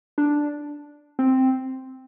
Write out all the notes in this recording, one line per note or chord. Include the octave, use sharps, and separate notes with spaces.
D4
C4